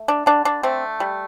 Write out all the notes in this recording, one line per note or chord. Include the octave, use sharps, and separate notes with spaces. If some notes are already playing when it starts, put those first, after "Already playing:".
Already playing: A3
D4
D3 D4
D4
A3 C4
G3